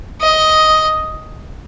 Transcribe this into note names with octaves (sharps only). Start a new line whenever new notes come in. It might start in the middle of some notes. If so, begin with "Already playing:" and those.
D#5